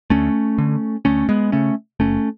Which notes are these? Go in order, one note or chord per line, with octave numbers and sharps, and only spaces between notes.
D2 A3 C#4
D3
D2 A3 C#4
G#3 B3
C#3 A3 C#4
F#1 A3 C#4